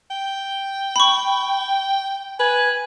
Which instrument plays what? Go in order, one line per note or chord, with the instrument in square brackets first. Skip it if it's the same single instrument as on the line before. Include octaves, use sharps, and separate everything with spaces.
[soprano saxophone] G5
[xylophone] B5 C#6
[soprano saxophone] B4 [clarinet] G#5